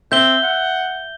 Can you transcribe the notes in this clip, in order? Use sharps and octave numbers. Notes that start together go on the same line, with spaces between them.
C4 E5 G6 G7
F#5